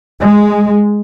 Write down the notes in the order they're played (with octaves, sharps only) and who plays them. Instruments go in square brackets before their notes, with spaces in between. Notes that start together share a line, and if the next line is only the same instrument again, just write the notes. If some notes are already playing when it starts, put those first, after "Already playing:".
[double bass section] G#3